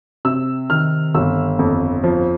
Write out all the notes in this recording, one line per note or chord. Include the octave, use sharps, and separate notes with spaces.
C3 E6
D#3 F6
G1 E6
F2
F3